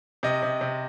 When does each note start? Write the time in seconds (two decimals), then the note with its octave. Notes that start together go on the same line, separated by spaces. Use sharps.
0.23 C3 D#5
0.43 C3
0.61 C3